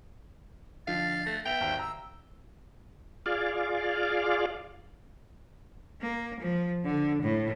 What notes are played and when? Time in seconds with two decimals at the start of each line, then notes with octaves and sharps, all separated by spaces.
0.87 D3 F3 F5 A6
1.26 A3 A#6 C7
1.45 B3 E5 G5 F7
1.61 G#1 D#2
1.79 A#5 E6
3.26 F4 G#4 D5 F5
6.02 A#3
6.40 F3
6.85 D3
7.22 A2